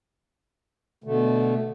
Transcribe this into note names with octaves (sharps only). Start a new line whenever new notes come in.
B2 D3 A3